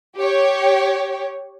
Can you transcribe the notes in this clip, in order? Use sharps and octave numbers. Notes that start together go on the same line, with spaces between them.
G4 C#5